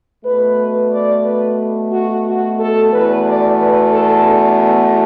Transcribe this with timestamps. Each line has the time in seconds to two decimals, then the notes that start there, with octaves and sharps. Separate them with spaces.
0.25 B2 A3 B4
0.92 D5
1.25 B4
1.93 F#4
2.26 F#4
2.59 A4
2.92 E2 B2 A3 B4
3.27 D5
3.60 B4
3.93 A4
4.27 D4
4.60 B3